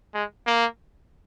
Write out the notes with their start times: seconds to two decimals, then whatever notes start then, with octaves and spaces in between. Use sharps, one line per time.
0.14 G#3
0.47 A#3